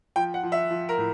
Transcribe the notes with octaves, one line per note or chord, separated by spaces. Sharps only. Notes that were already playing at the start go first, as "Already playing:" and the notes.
F3 G5
F#5
F3
E5
F3
A#4
A2